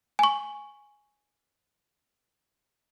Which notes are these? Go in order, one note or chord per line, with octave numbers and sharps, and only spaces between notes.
G#5 C#6